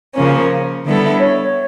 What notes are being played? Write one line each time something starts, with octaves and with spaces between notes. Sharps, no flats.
C#3 F3 A#3 C#4
D3 G3 B3 E4 A4
C#5